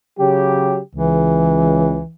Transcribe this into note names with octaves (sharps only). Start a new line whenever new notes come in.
C#3 F#3 G4
C#2 E3